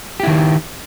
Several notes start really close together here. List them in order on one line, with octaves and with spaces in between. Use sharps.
G4 E4 D#3